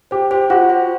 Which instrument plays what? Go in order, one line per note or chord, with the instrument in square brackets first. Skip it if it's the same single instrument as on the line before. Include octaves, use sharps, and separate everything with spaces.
[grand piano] G4 [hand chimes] C5
[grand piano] G4 [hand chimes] C5
[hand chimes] F4 [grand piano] F#4
[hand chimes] C5